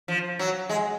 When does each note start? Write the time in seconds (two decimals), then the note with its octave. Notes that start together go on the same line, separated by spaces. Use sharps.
0.08 F3
0.39 F#3
0.69 G#3